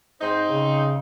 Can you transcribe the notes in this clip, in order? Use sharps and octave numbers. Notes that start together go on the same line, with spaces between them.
G#2 C4 D#4 C5
C#3